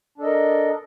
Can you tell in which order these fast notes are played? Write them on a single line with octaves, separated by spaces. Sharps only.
D4 A4 D#5 A#4